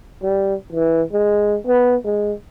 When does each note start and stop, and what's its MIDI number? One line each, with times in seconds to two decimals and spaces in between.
0.23 0.55 55
0.73 1.02 52
1.12 1.56 56
1.67 1.96 59
2.05 2.32 56